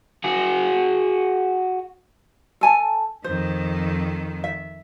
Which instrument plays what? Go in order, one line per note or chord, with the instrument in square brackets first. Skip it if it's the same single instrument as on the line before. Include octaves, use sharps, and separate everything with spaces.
[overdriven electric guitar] F#4 G#4
[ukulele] A4 G#5 A5
[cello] F2 D#3 [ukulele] C5
[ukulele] E5